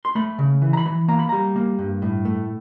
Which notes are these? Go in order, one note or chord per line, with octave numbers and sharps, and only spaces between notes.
C6
A3 B5
C#3
E3
A#5
B5
E3
A#3 A#5
B5
G3 A#5
A#3
G2
A2
A3